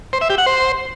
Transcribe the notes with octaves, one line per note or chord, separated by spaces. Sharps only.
C5
E5
G4
F#5
C5